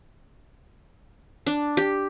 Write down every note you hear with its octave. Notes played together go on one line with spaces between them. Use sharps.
D4
G4